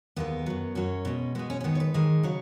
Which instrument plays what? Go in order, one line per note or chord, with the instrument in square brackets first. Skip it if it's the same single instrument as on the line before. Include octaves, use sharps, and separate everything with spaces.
[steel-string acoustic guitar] D#2 D#3 G#3 B3
F#2 F#3
F#2 F#3 C#4
B2 G#3
B2 G#3 B3
C#4
C#4
G#2 D#3 G#3 B3
C#5
B4
G#2 D#3 G#3 G#4
C#3 F#3 C#5